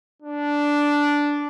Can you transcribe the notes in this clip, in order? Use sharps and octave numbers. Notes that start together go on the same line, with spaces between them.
D4